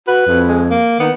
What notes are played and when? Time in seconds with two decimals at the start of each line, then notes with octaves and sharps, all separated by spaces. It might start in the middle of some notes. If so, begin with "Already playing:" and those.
0.07 F#4 B4
0.27 F2
0.49 G#3
0.70 A#3
1.00 D#3 B3